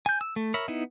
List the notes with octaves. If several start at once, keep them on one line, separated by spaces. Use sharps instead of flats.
G#5 G6
E6
A3
A#4 C#5 E5 B5
B3 D#4 E4